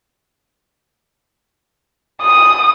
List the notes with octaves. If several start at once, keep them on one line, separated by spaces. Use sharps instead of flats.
D#6